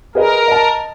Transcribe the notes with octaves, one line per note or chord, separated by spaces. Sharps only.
G#4 A#4 B4 D#5
D#5 A5